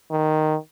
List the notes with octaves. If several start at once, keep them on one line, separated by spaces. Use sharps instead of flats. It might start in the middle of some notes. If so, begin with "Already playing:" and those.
D#3